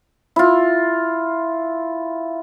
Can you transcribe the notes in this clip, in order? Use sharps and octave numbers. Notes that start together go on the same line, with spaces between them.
E4 F4